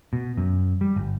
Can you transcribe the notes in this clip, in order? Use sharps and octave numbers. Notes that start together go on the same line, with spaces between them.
B2
F#2
G3
G1